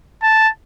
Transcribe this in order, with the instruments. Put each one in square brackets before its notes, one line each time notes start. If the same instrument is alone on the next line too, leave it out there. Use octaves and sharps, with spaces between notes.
[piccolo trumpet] A5